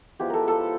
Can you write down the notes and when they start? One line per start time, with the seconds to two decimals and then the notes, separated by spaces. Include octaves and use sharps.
0.19 F3 G#3 B3 E4 G4
0.30 A4 A#4
0.48 A4